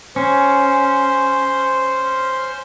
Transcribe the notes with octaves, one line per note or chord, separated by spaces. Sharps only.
C#4 C5